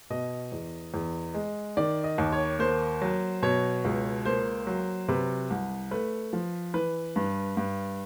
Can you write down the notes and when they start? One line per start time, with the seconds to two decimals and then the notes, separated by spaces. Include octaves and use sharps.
0.10 B2 D#5
0.52 E2
0.94 E2
1.34 G#3
1.77 D#3 D5
2.04 D#5
2.18 D#2
2.32 C#5
2.59 A#3 C5
3.02 F#3
3.42 B2 C#5
3.85 C#2
4.25 A#3 C5
4.67 F#3
5.08 C3 B4
5.50 C2
5.91 A3 B4
6.33 F3
6.74 E3 B4
7.16 G2
7.57 G2